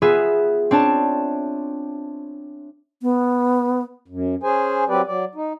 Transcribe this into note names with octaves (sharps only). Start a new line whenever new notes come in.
B3 F4 G#4 B4 E5
C4 D4 C#5 A5
B3
F#2
C#4 G#4 C5 G#5
F#3 C4 G4 B4 D5
F#3 D5
D#4